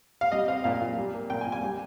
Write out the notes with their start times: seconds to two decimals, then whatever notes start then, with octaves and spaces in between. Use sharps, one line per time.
0.21 F5
0.32 G3 D#5
0.48 C4 F5
0.64 A#2 F5
0.81 A#2
0.98 G3
1.14 A#3
1.30 A#2 G5
1.41 G#5
1.47 A#2
1.52 G#5
1.63 G3